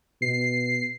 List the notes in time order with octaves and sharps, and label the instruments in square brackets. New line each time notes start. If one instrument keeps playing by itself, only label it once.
[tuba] B2 [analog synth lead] C7